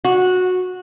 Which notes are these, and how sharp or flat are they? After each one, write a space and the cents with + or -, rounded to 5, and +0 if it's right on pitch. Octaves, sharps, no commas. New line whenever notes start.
F#4 -15